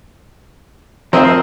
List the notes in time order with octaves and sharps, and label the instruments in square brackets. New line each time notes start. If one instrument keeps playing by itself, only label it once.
[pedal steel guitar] F3 D#5 E5 [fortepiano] C4 C5 [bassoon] A#4